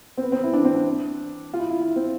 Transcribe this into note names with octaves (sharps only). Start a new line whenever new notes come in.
C4
B3
C4
E4
D4
C4
D4
F4
E4
E4
E4
C4